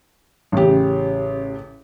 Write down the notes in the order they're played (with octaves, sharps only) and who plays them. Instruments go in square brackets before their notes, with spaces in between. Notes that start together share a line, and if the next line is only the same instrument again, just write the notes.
[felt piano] A1 C#3 G4